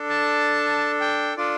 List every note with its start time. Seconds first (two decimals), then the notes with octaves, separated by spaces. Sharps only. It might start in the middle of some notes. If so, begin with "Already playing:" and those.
Already playing: D4 A4
0.09 A5
1.01 G5
1.37 D4 F4 A4 D5